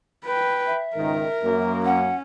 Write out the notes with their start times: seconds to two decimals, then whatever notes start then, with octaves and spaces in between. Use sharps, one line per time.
0.25 B4 G5
0.66 E5
0.96 C#2 G#2 D#3 A#4
1.44 F#2 A#3
1.85 C#4 F#5